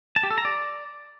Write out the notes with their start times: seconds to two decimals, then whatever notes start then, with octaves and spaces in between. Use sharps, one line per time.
0.16 A5
0.23 G4
0.31 A4
0.38 A#5
0.45 D5